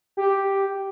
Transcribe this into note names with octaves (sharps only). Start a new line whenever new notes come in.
G4